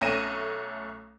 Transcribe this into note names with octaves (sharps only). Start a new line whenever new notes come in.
B1 A3 C#4 A#6 D#7 E7